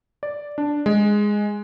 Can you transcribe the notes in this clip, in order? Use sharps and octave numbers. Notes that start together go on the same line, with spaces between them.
D5
D4
G#3